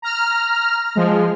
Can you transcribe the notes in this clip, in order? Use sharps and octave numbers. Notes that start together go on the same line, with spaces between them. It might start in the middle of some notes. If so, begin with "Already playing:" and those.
A#5 F6
F3 G#3